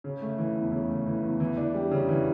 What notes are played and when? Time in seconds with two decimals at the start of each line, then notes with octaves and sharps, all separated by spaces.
0.04 C#3
0.21 A3
0.38 E3
0.55 E2
0.72 C#3
0.89 A3
1.06 E3
1.23 E2
1.40 E3
1.57 D4
1.74 G3
1.91 C#3
2.09 E3